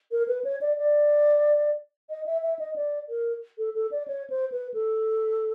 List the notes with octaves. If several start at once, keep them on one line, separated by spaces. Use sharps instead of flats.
A#4
B4
C#5
D5
D5
D#5
E5
E5
D#5
D5
A#4
A4
A4
D5
C#5
C5
B4
A4